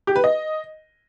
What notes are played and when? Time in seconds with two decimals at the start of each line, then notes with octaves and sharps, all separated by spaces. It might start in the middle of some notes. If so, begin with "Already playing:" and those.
0.07 G4
0.16 B4
0.24 D#5